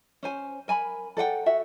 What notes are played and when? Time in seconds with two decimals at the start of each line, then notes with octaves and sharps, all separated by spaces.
0.23 C#4 C5 G#5
0.68 A#4 G#5 A5 B5
1.17 A4 D5 F#5 G5
1.46 F#4 E5